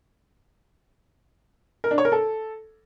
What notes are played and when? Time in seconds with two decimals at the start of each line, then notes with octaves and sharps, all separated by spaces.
1.84 A#4
1.91 D4
1.98 C#5
2.05 A#4
2.12 A4